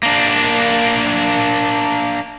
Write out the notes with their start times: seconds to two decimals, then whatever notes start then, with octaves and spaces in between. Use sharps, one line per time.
0.03 A#3 D4